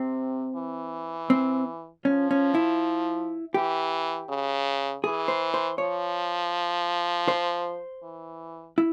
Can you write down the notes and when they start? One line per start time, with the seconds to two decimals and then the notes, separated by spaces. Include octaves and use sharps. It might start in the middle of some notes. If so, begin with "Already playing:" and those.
Already playing: C3 C4
0.55 E3
1.30 C4
2.05 F3 C#4
2.31 C#4
2.55 E4
3.54 E3 G4
4.29 C#3
5.04 E3 G#4
5.28 C5
5.54 C5
5.78 F3 C#5
7.28 C5
8.03 E3
8.78 E4